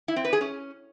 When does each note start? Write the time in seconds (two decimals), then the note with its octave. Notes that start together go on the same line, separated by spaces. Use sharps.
0.08 E4
0.16 C4
0.25 B4
0.33 G#4
0.41 C#4